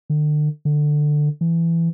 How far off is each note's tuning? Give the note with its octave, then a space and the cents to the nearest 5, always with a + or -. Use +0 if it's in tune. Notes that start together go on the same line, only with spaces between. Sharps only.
D3 +40
D3 +15
E3 +15